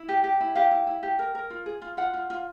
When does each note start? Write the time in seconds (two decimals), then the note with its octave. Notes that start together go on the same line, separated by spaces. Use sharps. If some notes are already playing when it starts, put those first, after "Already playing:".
Already playing: E4
0.09 G4
0.24 G4
0.40 E4
0.55 G4 F5
0.71 E4
0.87 E4
1.03 G4
1.19 A#4
1.35 A#4
1.50 F4
1.66 G#4
1.82 F4
1.97 F4 F#5
2.14 F4
2.30 F4